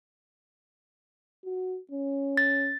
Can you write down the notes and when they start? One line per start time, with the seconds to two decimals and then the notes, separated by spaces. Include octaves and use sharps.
1.44 F#4
1.91 C#4
2.37 A6